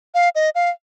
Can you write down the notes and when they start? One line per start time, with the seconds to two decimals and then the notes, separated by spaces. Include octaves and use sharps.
0.14 F5
0.35 D#5
0.55 F5